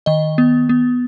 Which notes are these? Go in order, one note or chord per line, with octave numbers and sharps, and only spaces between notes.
D#3 D#5
B3
B3